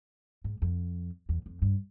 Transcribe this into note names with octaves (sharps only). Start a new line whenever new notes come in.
G#2
F2
E2
F2
G2